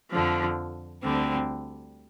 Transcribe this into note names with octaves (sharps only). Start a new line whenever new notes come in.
F2 D3 F3
D2 D3 G3 C4